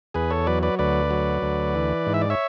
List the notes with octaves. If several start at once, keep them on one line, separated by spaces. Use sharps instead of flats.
E2 G#4 B4
A4 C#5
F#3 B4 D5
B4 D5
D2 B4 D5
F#3
D2
E3
G#2
E5
D5
C#5 E5